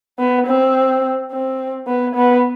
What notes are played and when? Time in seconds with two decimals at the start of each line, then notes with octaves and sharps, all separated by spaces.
0.19 B3
0.47 C4
1.32 C4
1.88 B3
2.15 B3